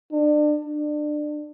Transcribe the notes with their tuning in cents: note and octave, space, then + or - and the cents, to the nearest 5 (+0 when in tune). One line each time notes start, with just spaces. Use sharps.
D4 +30
D4 +25